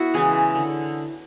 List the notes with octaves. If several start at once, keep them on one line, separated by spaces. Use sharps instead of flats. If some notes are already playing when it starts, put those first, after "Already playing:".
Already playing: B3 E4 F#4
C#3 E3 G#3 G#4
D3